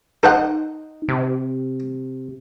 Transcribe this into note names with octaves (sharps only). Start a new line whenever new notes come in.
D#4 A4 C5 F#5
C3